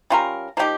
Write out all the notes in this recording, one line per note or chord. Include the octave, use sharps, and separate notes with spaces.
G3 C#4 F4 A#4
F3 A#3 D#4 G4